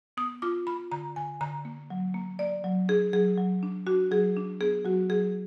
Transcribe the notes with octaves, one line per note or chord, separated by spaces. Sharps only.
B3 D#6
F4 D6
F4 B5
D3 A#5
D3 G#5
D3 A#5
A#3
F#3
A#3
A#3 D5
F#3
D4 G#4
F#3 G#4
F#3
D4
D4 F#4
F#3 G#4
D4
B3 G#4
F#3 F#4
F#3 G#4